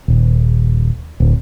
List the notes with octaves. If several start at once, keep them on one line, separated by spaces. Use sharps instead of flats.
D#1
D1